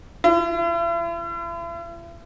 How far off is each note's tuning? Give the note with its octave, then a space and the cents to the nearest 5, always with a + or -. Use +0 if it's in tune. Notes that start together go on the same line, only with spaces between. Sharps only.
E4 +45